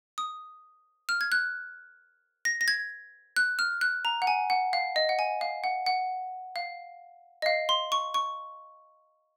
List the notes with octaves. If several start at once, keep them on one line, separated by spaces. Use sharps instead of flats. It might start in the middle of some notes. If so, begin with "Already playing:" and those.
D#6
F6
G#6
F#6
A#6
A#6
G#6
F#6
F6
F#6
A#5
F#5
G#5
F#5
F5
D#5
F#5
G#5
F5
F#5
F#5
F5
D#5
F5
C6
C#6
C#6